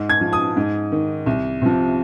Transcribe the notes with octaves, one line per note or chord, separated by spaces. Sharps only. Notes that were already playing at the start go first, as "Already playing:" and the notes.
Already playing: G#2
G#6
F3
D#6
G#2
D#3
C2
C3 F3